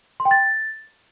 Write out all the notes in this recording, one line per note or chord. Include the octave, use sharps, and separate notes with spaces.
C6
G5
A6